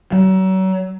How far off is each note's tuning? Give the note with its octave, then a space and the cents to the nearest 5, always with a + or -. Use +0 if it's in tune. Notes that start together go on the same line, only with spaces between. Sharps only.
F#3 +35